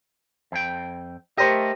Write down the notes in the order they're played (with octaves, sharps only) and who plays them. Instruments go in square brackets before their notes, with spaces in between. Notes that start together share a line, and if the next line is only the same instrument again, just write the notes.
[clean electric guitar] F2 G5
[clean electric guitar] A3 D#5 [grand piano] G4 A#4 C5